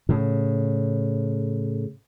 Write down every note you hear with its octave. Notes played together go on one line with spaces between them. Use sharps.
A2 C#3